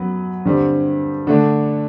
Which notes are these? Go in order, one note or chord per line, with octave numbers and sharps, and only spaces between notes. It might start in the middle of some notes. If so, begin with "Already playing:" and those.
Already playing: F#2 F#3 B3 B4
G2 D3 G3 C4
D3 A3 D4